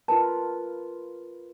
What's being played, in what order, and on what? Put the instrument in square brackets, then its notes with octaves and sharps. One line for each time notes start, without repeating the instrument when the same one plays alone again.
[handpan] F4 A#4 B4 [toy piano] A5